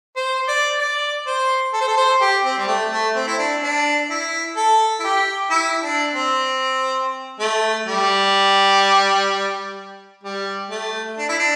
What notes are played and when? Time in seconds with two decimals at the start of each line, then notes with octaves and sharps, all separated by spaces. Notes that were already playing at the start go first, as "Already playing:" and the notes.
0.16 C5
0.48 D5
0.79 D5
1.27 C5
1.73 A4
1.81 C5
1.88 A4
1.97 C5
2.21 G4
2.45 C4
2.58 G3
2.68 A3
2.92 A3
3.16 C4
3.27 E4
3.38 D4
3.63 D4
4.10 E4
4.56 A4
5.00 E4
5.04 G4
5.51 E4
5.83 D4
6.14 C4
7.40 A3
7.87 G3
10.23 G3
10.70 A3
11.18 D4
11.29 E4
11.39 D4